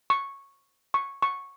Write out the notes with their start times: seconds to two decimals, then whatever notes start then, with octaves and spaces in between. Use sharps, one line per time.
0.10 C#6
0.94 C#6
1.22 C#6